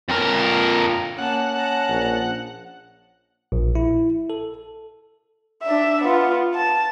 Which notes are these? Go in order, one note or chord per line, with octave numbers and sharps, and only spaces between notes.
F2 A#4
A#3 C#4 F#5 A5
A5 A#5
A#1
A#1
E4
A4
D4 E5
B3 F4
A5